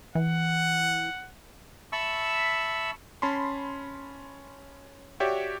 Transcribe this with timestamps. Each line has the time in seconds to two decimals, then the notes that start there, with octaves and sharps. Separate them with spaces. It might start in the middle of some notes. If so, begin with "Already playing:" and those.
0.15 E3 F#5
1.92 E5 A5 B5 C#6 E6
3.22 C#4 A5 B5 C6
5.20 F#4 G4 C#5 D5 E5 G5